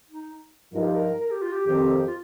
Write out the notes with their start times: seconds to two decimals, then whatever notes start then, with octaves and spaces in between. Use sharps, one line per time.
0.10 D#4
0.73 G2 F3 D#4 A#4
0.83 G4
0.94 A#4
1.20 A#4
1.31 G4
1.42 F4
1.52 G4
1.67 F2 D#3 C4 G4
2.07 F4